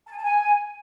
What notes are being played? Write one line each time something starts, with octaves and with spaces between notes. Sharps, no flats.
A5
G#5
A5
G#5